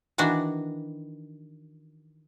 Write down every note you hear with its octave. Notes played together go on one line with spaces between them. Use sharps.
D#3 E3 D4 F#4